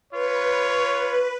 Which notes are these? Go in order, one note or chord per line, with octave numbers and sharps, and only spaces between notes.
F4 B4 C#5